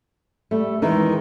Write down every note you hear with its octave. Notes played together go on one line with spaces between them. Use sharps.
G3 A3
E2 D#3 E3 G#3